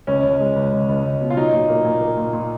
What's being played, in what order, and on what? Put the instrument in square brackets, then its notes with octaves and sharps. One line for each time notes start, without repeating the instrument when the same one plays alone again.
[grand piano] C#2 C#4
C#2
G#3
C#2
C#2
C#2
C#2
B2
F4
F#3 D#4
A#2
A#3
A#2
A#3
A#2
A#2